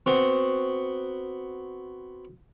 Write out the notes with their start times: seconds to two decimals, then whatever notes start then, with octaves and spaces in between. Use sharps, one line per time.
0.06 B3 C4 F#4